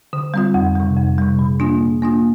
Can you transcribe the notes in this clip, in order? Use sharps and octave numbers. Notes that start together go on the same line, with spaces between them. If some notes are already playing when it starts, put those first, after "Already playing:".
D3
G3 C4 F4
F2
C3 G3
F2
C3 G3
A#2
A#3 D4 F4
A#2
A#3 D4 F4